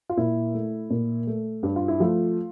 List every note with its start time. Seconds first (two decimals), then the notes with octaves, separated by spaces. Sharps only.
0.09 F4
0.17 A#2 E4
0.54 A3
0.90 A#2
1.27 A3
1.63 G2 G4
1.76 F4
1.88 E4
2.00 F3 A3 F4